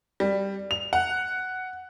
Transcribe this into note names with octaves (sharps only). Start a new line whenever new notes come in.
G3
F7
F#5